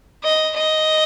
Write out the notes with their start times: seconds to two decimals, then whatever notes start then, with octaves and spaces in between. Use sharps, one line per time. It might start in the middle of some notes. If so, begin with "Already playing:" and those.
0.24 D#5
0.56 D#5